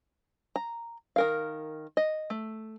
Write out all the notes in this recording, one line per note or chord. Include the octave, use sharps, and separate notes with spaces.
A#5
D#3 A#4 F5
D#5
A3